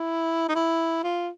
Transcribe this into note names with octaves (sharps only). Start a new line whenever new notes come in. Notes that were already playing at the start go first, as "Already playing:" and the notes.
Already playing: E4
D#4
E4
F4